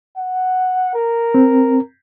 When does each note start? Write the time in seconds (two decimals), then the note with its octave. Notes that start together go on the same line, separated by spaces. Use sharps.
0.17 F#5
0.94 A#4
1.34 C4